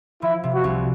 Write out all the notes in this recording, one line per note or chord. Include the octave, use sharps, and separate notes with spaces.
F3 E4
C3
F#4
C2